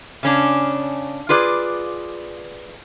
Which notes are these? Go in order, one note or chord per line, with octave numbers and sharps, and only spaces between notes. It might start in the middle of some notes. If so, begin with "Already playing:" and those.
C#3 C#4 D4
F4 G#4 B4 D5